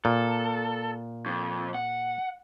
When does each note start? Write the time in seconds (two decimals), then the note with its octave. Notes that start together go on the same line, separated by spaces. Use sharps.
0.05 A#2 A4
1.26 F2
1.75 F#5